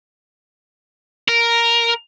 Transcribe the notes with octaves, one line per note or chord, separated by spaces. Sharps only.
A#4